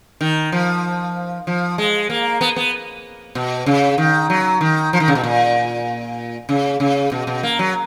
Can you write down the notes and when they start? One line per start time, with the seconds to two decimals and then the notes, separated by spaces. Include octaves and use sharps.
0.21 D#3
0.52 F3
1.47 F3
1.78 G#3
2.10 A#3
2.41 B3
2.56 B3
3.35 B2
3.66 C#3
3.98 D#3
4.30 F#3
4.61 D#3
4.93 F3
5.00 D#3
5.08 C#3
5.15 B2
5.24 A#2
6.49 C#3
6.80 C#3
7.12 B2
7.27 B2
7.43 A#3
7.59 F#3